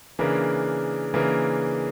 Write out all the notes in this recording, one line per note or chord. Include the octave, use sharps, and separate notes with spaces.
C#3 E3 A#3 D4 A#4
C#3 E3 A#3 D4 A#4